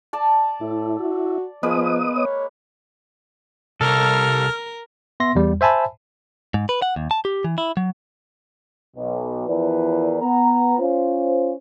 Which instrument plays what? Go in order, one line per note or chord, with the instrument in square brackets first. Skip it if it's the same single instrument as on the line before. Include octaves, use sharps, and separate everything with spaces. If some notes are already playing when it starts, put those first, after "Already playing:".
[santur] D5 A5
[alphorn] A2 [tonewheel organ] E4
[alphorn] F#4
[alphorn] F3 [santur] G#3 A#3 B4 [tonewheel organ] B3 D#5 D#6
[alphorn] C#5
[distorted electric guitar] C2 [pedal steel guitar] A4 [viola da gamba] A#4 [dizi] F6
[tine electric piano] B3 E5 C6 A#6
E2 G3
C5 E5 G#5 A5 B5
[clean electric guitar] G#2
B4
F#5
D#2
A5
G4
E3
E4
F#3
[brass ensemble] B1 B2
E2 F3 E4 A#4 B4 D5
B3 A#5
C#4 F4 C5